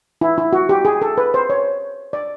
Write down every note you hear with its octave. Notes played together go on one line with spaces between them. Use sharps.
E4
E4
F#4
G4
G#4
A4
B4
C5
C#5
D5